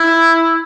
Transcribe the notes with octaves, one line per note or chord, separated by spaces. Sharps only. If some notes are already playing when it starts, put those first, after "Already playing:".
Already playing: E4